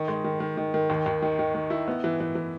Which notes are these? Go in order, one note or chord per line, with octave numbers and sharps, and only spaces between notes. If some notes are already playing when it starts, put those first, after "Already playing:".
Already playing: D#3
G#3
D#3
D#3
D#3
D#3
D#2
D#2
D#3
D#3
D#3
E4
B3
E3
E3
E3